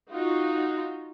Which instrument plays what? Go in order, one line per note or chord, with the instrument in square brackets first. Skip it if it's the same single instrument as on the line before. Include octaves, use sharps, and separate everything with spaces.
[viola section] D#4 F4 F#4